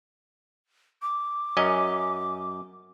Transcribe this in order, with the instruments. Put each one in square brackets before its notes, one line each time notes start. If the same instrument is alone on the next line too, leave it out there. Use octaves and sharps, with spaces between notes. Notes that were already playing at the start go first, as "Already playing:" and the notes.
[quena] D6
[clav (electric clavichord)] F#2 C#4 D#5